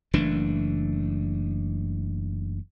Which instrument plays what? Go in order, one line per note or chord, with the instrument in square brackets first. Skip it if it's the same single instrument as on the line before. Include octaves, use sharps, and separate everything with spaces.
[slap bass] F#1 E3 A3 D4